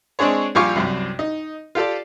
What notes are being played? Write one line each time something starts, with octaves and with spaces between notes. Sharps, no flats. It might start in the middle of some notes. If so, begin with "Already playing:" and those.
G#3 C4 D4 G#4 C#5
A#1 G3 F4 G#5 C#6 D6
C2 F#2 C3
D#4
F4 G4 A4 D5